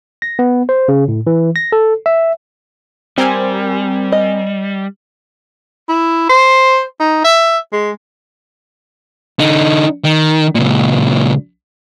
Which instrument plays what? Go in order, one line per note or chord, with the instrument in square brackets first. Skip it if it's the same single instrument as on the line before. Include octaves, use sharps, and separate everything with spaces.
[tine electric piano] A#6
B3
C5
C#3
A2
E3
A#6
A4
E5
[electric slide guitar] G3 [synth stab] C4 A#4 G#5 [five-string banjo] G4
[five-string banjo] D#5
[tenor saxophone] E4
C5
D#4
E5
G#3
[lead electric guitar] D3 D#4
D#3
C#2 A#2